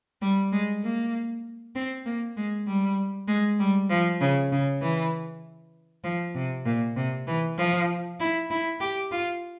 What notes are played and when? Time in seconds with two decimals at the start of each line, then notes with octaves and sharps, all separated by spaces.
0.22 G3
0.52 G#3
0.83 A#3
1.75 C4
2.06 A#3
2.37 G#3
2.67 G3
3.28 G#3
3.59 G3
3.90 F3
4.21 C#3
4.52 C#3
4.82 E3
6.04 F3
6.35 C3
6.66 A#2
6.96 C3
7.27 E3
7.58 F3
8.20 E4
8.50 E4
8.81 G4
9.12 F4